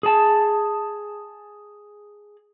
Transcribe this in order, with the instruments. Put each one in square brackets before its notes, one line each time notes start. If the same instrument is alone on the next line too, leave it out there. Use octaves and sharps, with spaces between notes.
[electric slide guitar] G#4 A5